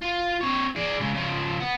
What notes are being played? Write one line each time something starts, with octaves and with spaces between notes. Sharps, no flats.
F4
C4 C#5
G#4 D5
C#3 G#3
C#3 F3
B3